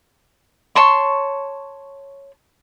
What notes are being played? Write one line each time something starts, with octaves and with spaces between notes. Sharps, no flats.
C#5 A5 C6 C#6